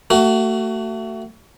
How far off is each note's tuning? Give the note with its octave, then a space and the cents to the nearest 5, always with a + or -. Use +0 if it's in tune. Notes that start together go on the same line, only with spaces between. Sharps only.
A3 +25 F#4 +30